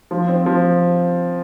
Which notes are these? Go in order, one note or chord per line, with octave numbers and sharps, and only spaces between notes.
F3
C4
F3